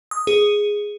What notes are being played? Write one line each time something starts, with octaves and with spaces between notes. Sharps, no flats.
D#6
G#4